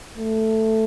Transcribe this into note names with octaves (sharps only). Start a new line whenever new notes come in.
A3